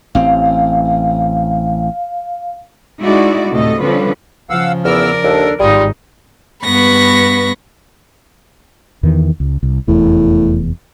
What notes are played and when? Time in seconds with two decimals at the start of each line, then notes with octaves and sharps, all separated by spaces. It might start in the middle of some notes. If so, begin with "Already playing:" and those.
0.15 A1 C4 F5
3.01 G#3 D#4 E4 F#4 D5
3.51 D2 A2 C3 A3 A4 D#5
3.81 D3 F3 G3 C4 C#4 B4
4.50 C#3 F3 F5 F#5 E6
4.85 E2 B3 A#4 D5 E6 F6
5.24 D#2 D4 A4
5.60 G#1 D#3 G3 D#4 F4 G#4
6.64 G2 B3 B4 B5 C#6 A#6
9.03 E2 D#3 E3
9.40 C#2
9.63 C2
9.88 F1 E2 A2